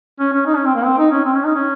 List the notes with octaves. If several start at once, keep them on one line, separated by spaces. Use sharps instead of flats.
C#4
C#4
D#4
C#4
C4
A#3
C4
D#4
C#4
C4
C#4
D#4
C#4